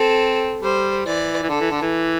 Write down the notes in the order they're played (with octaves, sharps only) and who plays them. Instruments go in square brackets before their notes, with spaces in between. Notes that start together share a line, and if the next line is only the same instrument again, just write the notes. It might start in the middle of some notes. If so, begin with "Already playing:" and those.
Already playing: [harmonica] C4 [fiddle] A4
[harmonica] G3 [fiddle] C5
[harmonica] E3 [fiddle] D5
[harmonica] E3
[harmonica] D3 [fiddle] A4
[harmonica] E3
D3
E3